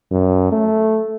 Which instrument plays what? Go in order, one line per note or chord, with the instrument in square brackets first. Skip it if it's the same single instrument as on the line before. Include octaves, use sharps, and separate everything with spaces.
[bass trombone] F#2
A3